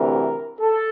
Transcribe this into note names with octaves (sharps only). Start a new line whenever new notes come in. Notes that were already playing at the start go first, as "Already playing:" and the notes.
Already playing: D2 C3 E3 A#4
A4